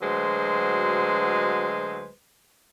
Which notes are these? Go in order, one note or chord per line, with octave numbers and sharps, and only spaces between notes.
D2 F#3 G#3 B4 C5